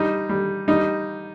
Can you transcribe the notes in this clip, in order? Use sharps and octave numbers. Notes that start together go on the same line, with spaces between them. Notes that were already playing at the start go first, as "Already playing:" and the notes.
Already playing: G3 D#4
G3
G3 D#4